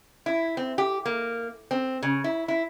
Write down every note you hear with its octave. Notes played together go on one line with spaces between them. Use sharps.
E4
C4
G4
A#3
C4
C#3
E4
E4